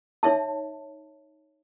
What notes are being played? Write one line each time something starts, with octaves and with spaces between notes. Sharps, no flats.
D#4 C#5 E5 A5